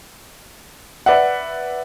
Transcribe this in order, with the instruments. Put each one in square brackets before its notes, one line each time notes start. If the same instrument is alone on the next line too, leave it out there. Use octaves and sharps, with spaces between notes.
[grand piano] B4 D5 E5 F#5